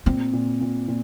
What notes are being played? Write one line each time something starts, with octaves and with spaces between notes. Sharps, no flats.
A#2 C4
A#2
A#2
A#2